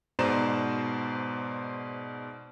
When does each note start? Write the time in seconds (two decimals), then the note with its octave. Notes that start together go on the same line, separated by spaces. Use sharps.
0.19 G#2 B2 C5 D5 A#5 E7